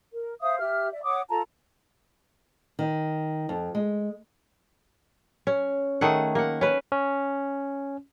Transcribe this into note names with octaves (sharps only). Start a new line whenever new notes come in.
A#4
C5 E5 F5 D#6
G4 E5 F6
D5 E5
C#5 F#5 D6 D#6
F4 A4 A5 A#5
D#3
F2
G#3
C#4
D#3 A3 G#4 F#5
A#3 F#5
C#4 B4
C#4